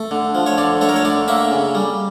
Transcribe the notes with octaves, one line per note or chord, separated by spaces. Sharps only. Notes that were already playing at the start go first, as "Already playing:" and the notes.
Already playing: A3
D3
F3
C#5
D3 D5
A3 C#5
A#4
C#5
D3 D5
A#3 E5
C#3
G3